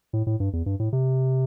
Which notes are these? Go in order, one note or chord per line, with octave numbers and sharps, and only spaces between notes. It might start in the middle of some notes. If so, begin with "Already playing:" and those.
A2
A2
G2
E2
G2
A2
C3